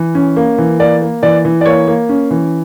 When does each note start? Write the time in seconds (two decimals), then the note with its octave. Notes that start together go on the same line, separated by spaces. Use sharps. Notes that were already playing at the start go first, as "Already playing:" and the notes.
Already playing: E3
0.15 C#4
0.36 A#3
0.58 E3
0.80 A#3 D5
1.02 A#3
1.23 E3 D5
1.45 E3
1.61 D5
1.66 A#3 C#5
1.87 A#3
2.09 C#4
2.31 E3